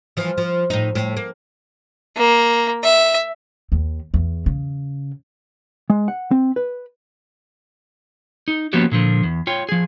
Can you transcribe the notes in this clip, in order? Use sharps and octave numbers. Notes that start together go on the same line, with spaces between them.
E3 F3
F3
A2 D#4
A2
A#3
A#3
E5
D#2
E2
C#3
G#3
F#5
C4
B4
D#4
F3 A#3 B3 C#4 F#4 G4
A#2 D3 F3
E2
F4 C#5 G5
F3 G#4